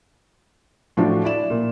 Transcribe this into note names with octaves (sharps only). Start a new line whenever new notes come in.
A2 F3 D4 F#4
E4 D5 E7
A#2